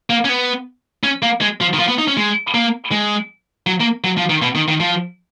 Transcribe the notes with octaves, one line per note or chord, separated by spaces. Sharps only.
A#3
C#4
B3
C#4
A#3
G#3
F3
D#3
F3
B3
D#4
C#4
G#3
A#3
G#3
F#3
A#3
F#3
F3
D#3
B2
D#3
D#3
F3